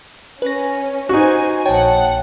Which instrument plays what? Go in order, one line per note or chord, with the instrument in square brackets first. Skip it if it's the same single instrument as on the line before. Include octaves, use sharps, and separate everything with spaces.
[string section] C#4 [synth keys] B4 A#6
[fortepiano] D#4 F#4 [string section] C5 G#5
[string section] A#1 F#5 [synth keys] C#5 G5 A5